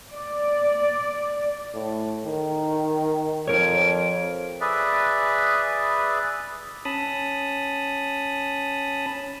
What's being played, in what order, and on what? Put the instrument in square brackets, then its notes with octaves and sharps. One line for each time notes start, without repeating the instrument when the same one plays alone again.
[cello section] D5
[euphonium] A2
D#3
[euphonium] F2 [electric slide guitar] A#4 C#5
[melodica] G#4 B4 D5 E5
[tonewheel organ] C#4 A5 B5 D#6